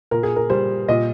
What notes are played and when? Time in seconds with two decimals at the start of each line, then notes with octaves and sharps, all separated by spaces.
0.11 A#2 A#4
0.23 G#4
0.36 A#4
0.50 G3 C5
0.88 A#2 D#5